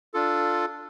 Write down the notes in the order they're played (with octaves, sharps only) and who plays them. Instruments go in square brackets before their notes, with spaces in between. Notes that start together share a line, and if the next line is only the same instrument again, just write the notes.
[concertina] D4 F4 A4